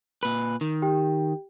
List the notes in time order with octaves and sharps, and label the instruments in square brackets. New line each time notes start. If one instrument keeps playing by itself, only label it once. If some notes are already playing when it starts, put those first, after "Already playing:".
[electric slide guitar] A#2 B4
D#3
[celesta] G4 G5